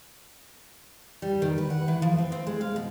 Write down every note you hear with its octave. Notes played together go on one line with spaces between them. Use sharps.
G3
D#3
B4
F#5
E3
F3
C4
C4
G#3
F5
B2